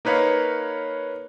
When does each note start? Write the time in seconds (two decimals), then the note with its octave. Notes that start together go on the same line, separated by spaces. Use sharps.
0.05 A#3 D#4 B4 C#5 F5